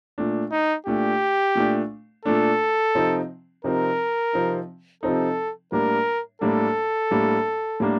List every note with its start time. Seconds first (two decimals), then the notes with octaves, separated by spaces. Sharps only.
0.18 A#2 A3 D4
0.52 D#4
0.86 A#2 A3 D4 G4
1.56 A#2 A3 D4
2.25 A#2 A3 D4 A4
2.95 C3 F3 C4 D#4
3.64 C3 F3 C4 D#4 A#4
4.33 C3 F3 C4 D#4
5.03 C3 F3 C4 D#4 A4
5.72 A2 G3 A#3 D4 A#4
6.41 A2 G3 A#3 D4 A4
7.11 A2 G3 A#3 D4
7.80 A2 G3 A#3 D4